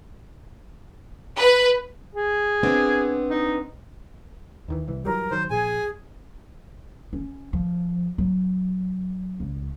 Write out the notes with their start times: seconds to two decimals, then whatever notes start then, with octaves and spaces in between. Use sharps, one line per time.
1.37 B4
2.15 G#4
2.63 B3 C4 D4
3.30 D#4
4.68 D#2 D#3 E3
4.88 C2 E3
5.05 E3 F#3 G3 A#4
5.32 D#3 F#3 C5
5.50 A#1 G#4 G#5
7.13 C#4
7.53 F3
8.18 F#3
9.40 C#2